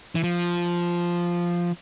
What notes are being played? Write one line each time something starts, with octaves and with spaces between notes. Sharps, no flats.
E3
F3